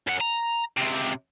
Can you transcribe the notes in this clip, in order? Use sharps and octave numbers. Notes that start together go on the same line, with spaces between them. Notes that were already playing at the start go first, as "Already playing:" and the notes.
F#2 F#5
A#5
C#2 C3